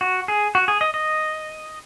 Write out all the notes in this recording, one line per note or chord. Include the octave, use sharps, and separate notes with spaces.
F#4
G#4
F#4
G#4
D#5
D#5